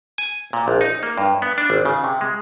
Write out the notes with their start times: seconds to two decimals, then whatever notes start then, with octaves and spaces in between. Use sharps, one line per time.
0.18 G#5
0.53 A#2
0.68 A#1
0.81 D#4
1.03 A#3
1.18 G2
1.42 B3
1.58 D4
1.70 G#1
1.85 C#3
2.04 C3
2.21 G#3